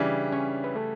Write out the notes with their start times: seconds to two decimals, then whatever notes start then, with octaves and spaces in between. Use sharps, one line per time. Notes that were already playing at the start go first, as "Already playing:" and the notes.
Already playing: C#3 E3 G3 D4 D5
0.32 C#4 C#5
0.64 B4
0.75 A3 A4